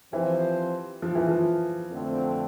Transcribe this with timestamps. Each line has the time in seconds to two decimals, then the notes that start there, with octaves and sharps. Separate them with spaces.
0.13 E3 F3 C4 G4 C5
1.02 F3
1.15 E3
1.29 F3
1.92 F2 D3 A3 C4